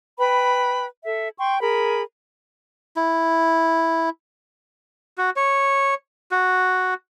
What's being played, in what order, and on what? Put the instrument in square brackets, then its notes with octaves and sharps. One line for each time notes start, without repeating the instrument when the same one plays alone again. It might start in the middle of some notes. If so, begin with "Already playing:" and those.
[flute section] B4 G5 B5
A4 E5
G5 C6 C#6
G#4 A#4 B5
[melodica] E4
F#4
C#5
F#4